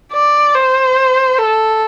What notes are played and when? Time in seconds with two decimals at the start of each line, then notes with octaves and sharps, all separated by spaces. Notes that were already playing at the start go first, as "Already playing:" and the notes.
0.13 D5
0.55 C5
1.38 A4